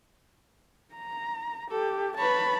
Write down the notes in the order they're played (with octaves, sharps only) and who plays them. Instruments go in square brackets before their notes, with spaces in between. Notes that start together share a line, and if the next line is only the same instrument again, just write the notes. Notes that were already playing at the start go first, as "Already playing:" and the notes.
[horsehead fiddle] A#5
[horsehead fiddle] G4 [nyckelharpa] A4
[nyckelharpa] B4 C#5 [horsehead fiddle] A5 B5